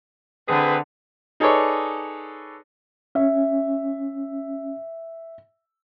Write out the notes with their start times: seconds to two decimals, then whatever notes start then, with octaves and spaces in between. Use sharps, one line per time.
0.48 D3 C4 G#4 B4
1.40 D#4 G#4 A4 B4 C#5 D5
3.15 C#4 E5